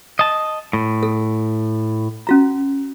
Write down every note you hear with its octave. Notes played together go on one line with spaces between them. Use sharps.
D#5 A5
A2
A4
C#4 F#4 A#5